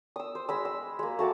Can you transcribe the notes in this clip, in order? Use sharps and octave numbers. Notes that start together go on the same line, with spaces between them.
D#6 E6
C5
G#3 B5 E6
E6
G#3 A#3
A3 F#4 A5 D6